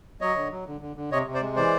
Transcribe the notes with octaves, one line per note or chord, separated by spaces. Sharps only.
F#3 C#5 D#5
D3
F#3
D3
D3
D3
C3 C#5 D#5
C3
C5 D5
G#3
E3 C5 D5